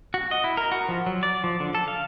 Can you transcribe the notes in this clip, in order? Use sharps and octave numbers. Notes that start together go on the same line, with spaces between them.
F#4
D#5
E4
A#4
F#4
F3
F#3
D5
F3
D3
A4
F5